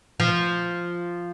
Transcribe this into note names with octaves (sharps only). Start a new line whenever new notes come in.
F3